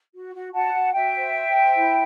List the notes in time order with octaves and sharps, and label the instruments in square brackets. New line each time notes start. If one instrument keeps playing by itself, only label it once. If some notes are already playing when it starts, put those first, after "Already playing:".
[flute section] F#4
F#4
F#4 F#5 A5
F#4
F#4 E5 G5
C5
C5
C5
E4